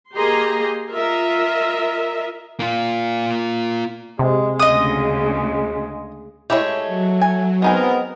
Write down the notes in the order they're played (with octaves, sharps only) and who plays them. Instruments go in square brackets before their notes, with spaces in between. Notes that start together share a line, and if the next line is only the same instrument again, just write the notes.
[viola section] A#3 G4 G#4 D#5 A#5 C6
F4 A#4 D#5 E5
[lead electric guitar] A#3 F4
[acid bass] C3 [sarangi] G#3
[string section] D2 C#3 [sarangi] G#3 [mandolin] D#5 D#6
[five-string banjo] G#3 E4 G4 [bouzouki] A3 C#5
[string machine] F#3
[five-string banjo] G#5
[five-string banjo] G#3 D#4 G#5 [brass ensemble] B3 C4 A#4